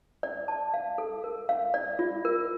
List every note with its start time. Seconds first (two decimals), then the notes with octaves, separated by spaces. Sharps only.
0.23 D5
0.48 A5
0.74 F5
0.98 A4
1.24 A#4
1.49 F5
1.74 D5
1.99 F4
2.25 A#4